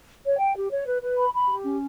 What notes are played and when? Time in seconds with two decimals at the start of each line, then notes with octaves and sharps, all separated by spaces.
0.24 C#5
0.39 G5
0.56 G4
0.70 C#5
0.87 B4
1.03 B4
1.18 B5
1.33 B5
1.49 G4
1.64 C#4